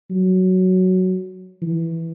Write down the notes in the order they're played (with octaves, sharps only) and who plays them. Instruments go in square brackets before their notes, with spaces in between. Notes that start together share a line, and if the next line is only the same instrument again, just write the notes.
[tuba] F#3
E3